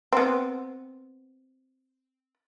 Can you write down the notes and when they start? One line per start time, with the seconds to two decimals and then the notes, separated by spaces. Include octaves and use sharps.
0.13 B3 C4